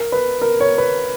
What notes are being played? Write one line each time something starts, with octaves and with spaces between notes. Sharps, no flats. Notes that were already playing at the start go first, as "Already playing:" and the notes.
Already playing: A#4
B4
A#4
C#5
B4